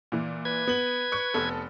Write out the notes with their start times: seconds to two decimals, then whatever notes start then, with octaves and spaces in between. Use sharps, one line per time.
0.12 A#2 E3
0.45 B4 G#6
0.67 B3 F#7
1.12 C#6 F#6 C#7
1.34 F1 B3 A4